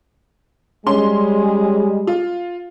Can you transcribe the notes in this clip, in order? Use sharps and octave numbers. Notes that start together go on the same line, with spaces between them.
G3 G#3 C#4 C6
F4